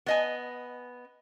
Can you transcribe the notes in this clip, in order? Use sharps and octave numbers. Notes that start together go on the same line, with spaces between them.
B3 D#5 G#5